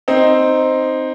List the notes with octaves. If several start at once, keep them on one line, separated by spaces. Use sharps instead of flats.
C4 D#4